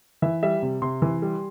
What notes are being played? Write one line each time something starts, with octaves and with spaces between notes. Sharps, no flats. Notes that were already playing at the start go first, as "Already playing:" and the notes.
E3 E5
G3 E5
C3
C3 C6
E3
G3